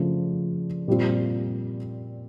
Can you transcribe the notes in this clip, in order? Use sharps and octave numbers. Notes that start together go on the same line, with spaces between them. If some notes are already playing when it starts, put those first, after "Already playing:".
Already playing: C#3 F3 A3 D4 F4
A#2 G3 C4 F4